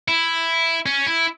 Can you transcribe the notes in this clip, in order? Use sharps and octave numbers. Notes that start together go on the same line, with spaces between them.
E4
C#4
E4